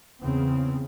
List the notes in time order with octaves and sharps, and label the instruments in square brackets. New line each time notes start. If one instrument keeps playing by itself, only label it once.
[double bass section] E2 C#3 C4